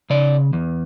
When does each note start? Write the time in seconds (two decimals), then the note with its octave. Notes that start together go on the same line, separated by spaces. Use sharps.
0.10 C#3 D5
0.53 E2